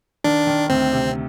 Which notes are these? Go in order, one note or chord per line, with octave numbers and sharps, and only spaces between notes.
D#3 D4
D#3
D2 C4
C3